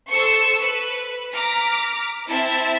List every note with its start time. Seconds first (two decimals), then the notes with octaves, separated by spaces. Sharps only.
0.10 A4 C5 C#6 E6
0.61 B4
1.34 A#5 D6 F6 B6
2.29 C4 E4 E5 A5